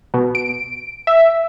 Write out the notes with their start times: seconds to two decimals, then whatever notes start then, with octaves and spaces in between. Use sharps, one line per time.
0.14 B2
0.35 D7
1.07 E5